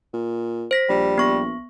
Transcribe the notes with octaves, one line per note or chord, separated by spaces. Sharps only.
A#2
C5 A#6 B6
A#1 G3
B3 C#6 A#6